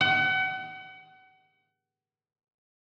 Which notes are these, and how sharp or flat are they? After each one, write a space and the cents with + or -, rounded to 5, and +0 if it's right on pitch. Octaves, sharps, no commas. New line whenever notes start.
F#5 +35